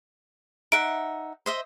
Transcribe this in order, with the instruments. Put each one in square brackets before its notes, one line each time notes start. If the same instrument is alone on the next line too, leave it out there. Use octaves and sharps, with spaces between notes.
[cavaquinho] D#4 E5 F#5 [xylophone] D7
[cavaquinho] C5 D#5 E5